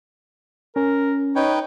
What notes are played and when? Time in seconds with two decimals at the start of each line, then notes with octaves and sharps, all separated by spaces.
0.76 C#4 A#4
1.36 D#4 B4 C#5 G5